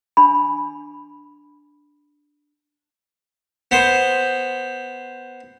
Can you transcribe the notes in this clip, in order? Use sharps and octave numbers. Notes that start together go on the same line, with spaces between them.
D4 B5
B3 C5